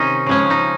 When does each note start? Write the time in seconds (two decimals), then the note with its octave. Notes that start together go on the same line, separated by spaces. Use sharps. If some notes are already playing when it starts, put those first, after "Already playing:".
Already playing: C3 D#3 C#4 D#4
0.26 C#3 F3 G#3 C#4
0.50 D#4